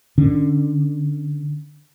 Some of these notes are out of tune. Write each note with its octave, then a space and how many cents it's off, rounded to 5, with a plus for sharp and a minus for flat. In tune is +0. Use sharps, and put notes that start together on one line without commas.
D3 +15 C#4 +0